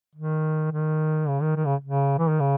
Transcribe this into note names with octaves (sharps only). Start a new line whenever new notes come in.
D#3
D#3
C#3
D#3
D#3
C#3
C#3
E3
D#3
C#3